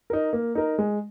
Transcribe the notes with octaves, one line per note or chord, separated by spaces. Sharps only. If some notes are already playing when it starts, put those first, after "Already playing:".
D#4 A#4
A#3
D#4 A#4
G#3